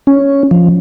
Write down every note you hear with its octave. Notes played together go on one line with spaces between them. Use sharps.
C#4
F3